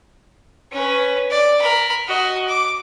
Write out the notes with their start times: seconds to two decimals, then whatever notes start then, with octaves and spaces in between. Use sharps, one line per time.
0.72 C#4 B4
1.31 D5
1.61 A#4 B5
2.07 F#4 D#5
2.48 D6